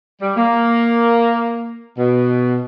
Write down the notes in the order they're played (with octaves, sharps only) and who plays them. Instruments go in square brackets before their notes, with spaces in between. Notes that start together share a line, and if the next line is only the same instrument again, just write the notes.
[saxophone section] G3
A#3
B2